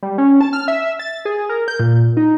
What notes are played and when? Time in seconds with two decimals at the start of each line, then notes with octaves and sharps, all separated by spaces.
0.03 G3
0.18 C#4
0.41 A5
0.53 F6
0.68 E5
0.99 A6
1.25 G#4
1.49 A#4
1.68 G6
1.80 A#2
2.17 D#4